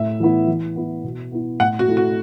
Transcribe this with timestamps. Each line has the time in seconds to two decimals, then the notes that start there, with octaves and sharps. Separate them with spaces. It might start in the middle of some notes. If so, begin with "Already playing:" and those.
Already playing: A2 E5
0.20 E3 B3 E4
0.48 E3
0.76 B3 E4
1.04 B2
1.32 B3 E4
1.60 A2 F#5
1.79 F#4
1.88 A3 E4
1.97 F#4